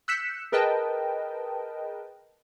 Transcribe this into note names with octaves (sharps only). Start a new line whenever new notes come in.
E6 F#6 G6 B6 C#7 E7
G#4 A#4 B4 D#5 G5 A5